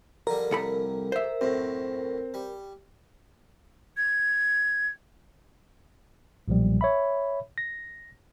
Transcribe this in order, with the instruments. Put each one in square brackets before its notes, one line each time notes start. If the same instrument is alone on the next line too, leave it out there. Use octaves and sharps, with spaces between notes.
[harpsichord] F2 D3 G3 [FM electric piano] A#4
[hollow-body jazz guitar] C2 A4 B5
C5 E5
[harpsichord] F#2 A2 [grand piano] C4
[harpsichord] G3
[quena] G#6
[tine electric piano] B1 A#2 F3 G3
C#5 E5 B5
A#6